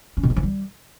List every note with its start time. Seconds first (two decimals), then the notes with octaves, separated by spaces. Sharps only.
0.17 C#4
0.23 B2
0.30 A3
0.36 E3
0.43 G3